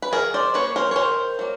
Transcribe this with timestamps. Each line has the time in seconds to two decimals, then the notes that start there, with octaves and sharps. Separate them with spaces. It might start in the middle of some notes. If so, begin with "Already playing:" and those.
0.02 B4
0.12 D#3 G#4 A#4
0.34 C5 D5
0.54 F#3 A#3 B4 C#5
0.76 A#4 C5
0.91 C#5
0.96 D#3 A#4 C5
1.39 F#3 A#3